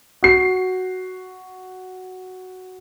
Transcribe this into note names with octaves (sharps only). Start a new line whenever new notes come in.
F#4 C7